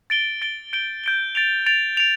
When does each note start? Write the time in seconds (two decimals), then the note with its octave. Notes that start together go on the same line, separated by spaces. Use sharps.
0.10 A6 D7 G7
0.42 A6 D7 G7
0.73 G6 D7 G7
1.04 G6 D7 G7
1.35 A6 D7 F7
1.66 A6 D7 F7
1.97 D7 F7